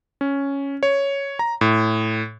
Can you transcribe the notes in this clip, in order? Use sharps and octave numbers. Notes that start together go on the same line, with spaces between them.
C#4
C#5
A#5
A2